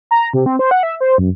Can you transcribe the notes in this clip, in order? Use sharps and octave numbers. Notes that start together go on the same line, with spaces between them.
A#5
C3
C4
C5
F#5
E5
C5
F#2